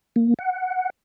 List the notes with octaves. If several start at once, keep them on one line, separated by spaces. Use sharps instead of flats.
A#3
F#5